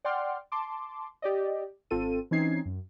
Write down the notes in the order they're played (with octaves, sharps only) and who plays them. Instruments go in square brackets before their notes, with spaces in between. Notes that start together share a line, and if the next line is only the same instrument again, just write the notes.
[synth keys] D5 F#5 G5 C6 D6 F6
A5 C6 D6
G4 D5 D#5
G#1 C4 F4 A4 D#7
E3 C4 C#4 D#4 G#6 C7
F#2